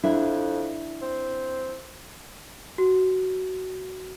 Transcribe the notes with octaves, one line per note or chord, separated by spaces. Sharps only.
F2 D4 E4
C4
F#4